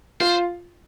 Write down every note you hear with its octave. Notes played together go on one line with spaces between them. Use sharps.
F4 C5